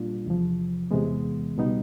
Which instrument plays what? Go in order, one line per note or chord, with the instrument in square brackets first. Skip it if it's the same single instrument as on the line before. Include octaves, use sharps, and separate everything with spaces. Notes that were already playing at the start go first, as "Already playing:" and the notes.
Already playing: [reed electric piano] A#2 G3 A#3 D4 F4
E2 C3 F3
E2 C3 E3 G#3 B3
C#2 B2 G3 B3 D#4